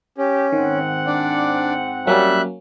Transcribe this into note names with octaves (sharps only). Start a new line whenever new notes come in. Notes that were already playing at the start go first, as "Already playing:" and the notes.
C#4 G4
G#2 D#3 C4 F#5
D4 D5
F#3 G3 A#3 C#4 E5 F#6